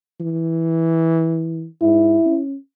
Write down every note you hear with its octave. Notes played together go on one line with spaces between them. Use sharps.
E3
G#2 E4
C#4